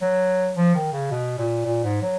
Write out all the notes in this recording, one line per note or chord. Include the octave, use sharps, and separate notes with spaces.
F#3
F3
D#3
C#3
B2
A#2
A#2
G#2
F#3